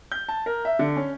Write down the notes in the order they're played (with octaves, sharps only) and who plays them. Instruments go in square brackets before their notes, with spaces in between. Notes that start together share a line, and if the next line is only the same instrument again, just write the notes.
[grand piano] G6
A5
A#4
E5
D3
C#4